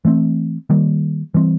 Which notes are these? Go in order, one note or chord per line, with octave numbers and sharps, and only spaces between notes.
E3 A3 C4
D#3 G3 A#3
E3 G3 C4